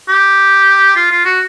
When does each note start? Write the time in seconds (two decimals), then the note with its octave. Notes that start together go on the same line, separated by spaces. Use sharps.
0.08 G4
0.96 F4
1.11 F4
1.25 F#4